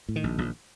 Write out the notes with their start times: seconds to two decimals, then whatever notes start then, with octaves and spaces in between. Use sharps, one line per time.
0.09 A2
0.16 D#3
0.24 A#1
0.38 A#1